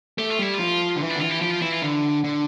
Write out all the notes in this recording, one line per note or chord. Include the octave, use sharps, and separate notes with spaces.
A3 G4
F4
G3 E4
F3 F4
D3
E3
D4
D3
E3 F4
G4
F3 G4
F4
E3 E4
F4
D3
D3